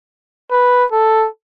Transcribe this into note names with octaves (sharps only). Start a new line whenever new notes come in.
B4
A4